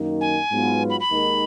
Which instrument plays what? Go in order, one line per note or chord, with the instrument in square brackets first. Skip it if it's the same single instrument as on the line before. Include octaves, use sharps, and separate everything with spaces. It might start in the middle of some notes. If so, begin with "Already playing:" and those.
Already playing: [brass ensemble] F#2 D#3 A#3 D#4
[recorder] G#5
[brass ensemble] G#2 F#3 B3 F4
[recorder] B5
B5
[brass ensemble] D#2 D#3 G#3 D#4 A#4